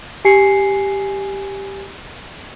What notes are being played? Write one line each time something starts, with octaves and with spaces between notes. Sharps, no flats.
G4 G#5 C7 C#7